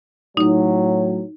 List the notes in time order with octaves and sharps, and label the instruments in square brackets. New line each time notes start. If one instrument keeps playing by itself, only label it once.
[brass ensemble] A2 F#3 [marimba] D#4 D#6